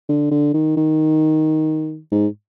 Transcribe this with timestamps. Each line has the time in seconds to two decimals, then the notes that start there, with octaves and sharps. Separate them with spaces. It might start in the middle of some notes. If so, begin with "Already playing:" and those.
0.09 D3
0.31 D3
0.54 D#3
0.77 D#3
2.12 G#2